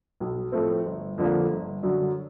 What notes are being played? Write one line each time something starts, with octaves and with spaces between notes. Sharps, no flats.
B1
A2 F3 A3 C4
G1
F2 D3 F3 A#3
G1
F#2 D3 F#3